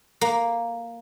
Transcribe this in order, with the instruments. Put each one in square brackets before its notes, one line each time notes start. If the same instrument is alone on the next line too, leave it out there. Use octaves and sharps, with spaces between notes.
[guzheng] A#3